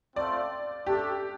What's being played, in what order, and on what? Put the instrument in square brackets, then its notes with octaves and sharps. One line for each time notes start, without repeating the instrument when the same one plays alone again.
[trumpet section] A3 C4 F4 [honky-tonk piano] D5
[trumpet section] A3 D4 A4 D5 [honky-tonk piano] G4